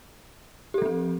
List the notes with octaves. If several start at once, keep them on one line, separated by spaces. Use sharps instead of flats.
F3 C4 G4 A4